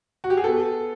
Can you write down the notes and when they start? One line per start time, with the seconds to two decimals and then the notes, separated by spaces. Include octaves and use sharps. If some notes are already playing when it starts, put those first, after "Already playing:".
0.24 F#4
0.30 G4
0.37 G#4
0.44 B3 A4